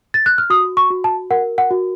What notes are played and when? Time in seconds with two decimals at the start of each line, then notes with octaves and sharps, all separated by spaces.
0.14 A6
0.26 F#6
0.38 F6
0.50 F#4 D#6
0.77 C#6
0.90 F#4
1.04 A5
1.30 A#4 F#5
1.58 F#5
1.71 F#4